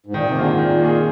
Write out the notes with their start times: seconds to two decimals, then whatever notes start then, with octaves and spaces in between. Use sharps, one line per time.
0.06 G#2
0.14 A#2 D#3
0.26 C3
0.36 D3 A#3 F4 G#4
0.50 G#2
0.58 A#2 D#3
0.80 A#3 F4 G#4